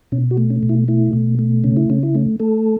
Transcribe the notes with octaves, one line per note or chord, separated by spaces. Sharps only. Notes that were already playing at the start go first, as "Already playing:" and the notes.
B2 C#4
F#4
A3
C#4
B2
E4
A3 E4
B2
A3
C#3 C#4
E4
C#3 C#4
E4
A3 C#4
A3 A4